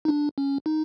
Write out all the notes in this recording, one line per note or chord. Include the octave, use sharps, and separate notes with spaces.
D#4
D4
C#4
D#4